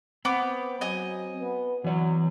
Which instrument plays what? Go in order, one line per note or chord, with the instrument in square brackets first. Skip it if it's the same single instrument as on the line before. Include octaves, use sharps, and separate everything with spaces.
[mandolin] B3 D6 [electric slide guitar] C4
[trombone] F#3 [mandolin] D#5 G#5
[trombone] B3
[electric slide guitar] E3 D5 [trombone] F#3